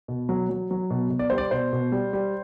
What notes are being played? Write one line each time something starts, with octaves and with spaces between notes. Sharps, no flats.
B2
F#3
F#3
F#3
B2
B2
D5
G3 C5
D5
B2 C5
B2
G3
G3